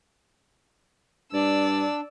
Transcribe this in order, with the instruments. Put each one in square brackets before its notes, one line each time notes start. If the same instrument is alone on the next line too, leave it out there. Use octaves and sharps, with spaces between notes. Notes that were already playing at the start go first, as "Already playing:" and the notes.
[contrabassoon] G2 [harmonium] D4 [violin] D5 E6